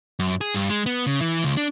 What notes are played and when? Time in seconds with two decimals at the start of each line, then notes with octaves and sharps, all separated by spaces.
0.19 F#2
0.41 G#4
0.54 G2
0.70 G#3
0.86 B3
1.07 C#3
1.21 E3
1.44 C#2
1.57 D4